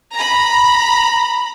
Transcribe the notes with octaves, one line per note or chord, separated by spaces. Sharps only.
A#5 B5